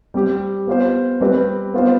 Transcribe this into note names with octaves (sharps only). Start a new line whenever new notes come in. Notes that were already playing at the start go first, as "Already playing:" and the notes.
G3 C4 G4
B3 F4 C5
G3 C4 G4 B4
B3 F4 C5